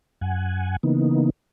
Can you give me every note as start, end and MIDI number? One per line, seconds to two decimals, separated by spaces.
0.21 0.76 42
0.21 0.76 78
0.21 0.76 80
0.83 1.30 49
0.83 1.30 52
0.83 1.30 58
0.83 1.30 59
0.83 1.30 63